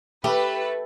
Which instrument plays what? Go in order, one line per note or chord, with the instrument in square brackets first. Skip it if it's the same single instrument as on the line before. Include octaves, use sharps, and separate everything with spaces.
[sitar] A3 [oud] G4 [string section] B4